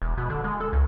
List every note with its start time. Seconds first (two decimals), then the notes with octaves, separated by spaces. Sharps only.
0.02 E1
0.18 B2
0.30 D3
0.44 G#3
0.60 A4
0.73 C#2